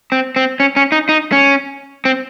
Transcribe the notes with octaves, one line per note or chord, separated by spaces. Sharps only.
C4
C4
C#4
C#4
D#4
D#4
C#4
C4